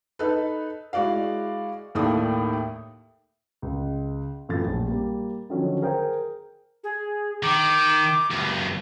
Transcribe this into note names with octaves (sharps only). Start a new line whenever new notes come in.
D#4 A4 B4
G#3 E4 F#4 D5 F5
D#2 A2 A#3 A4 D5 D#6
C#2
F#2 A2 E3 F4 A4 A6
A#1
G3 A#3
D3 D#3 F3 F#3 C#4
G#4 A#4 C5 G5
G#4
D#3 D6
C#2 F#2